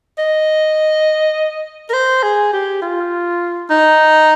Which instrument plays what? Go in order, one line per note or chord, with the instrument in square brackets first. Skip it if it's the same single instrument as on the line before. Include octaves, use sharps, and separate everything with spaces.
[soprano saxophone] D#5
A#4
C5
G#4
G4
F4
D#4